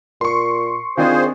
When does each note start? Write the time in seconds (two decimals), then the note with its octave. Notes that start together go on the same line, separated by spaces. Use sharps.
0.21 A#2 C6 C#6
0.97 D#3 C4 D4 F4 G#4 C5